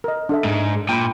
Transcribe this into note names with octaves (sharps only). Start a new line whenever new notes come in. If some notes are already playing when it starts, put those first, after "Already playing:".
A#4 D#5
D4 A4 E5
G#2 G#3
A#2 G5 B5